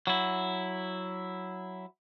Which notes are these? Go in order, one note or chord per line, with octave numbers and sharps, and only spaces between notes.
F#3 E4